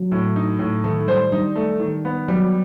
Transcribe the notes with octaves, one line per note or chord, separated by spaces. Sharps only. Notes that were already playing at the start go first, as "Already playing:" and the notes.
Already playing: F#3
A2
D#4
A2
D#3 A3
G3 C5
G3 D#4
A3
D#3
B3
F#3 G3